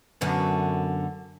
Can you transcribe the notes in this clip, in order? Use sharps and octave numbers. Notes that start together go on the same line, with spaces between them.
F#2 D3 B3